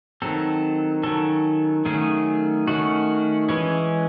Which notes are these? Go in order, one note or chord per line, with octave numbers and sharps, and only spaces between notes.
D#3 F#3 C4 A4
D#3 F#3 C#4 A4
D#3 F#3 A3 C#4 G#4
D#3 A3 C#4 F#4
E3 G#3 C#4